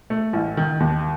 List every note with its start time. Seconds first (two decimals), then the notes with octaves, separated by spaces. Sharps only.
0.10 A3
0.33 A1
0.57 D#3
0.80 D#2